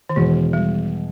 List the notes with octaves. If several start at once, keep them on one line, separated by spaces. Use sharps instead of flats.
D#3
E2 B2 E3 G#3
G3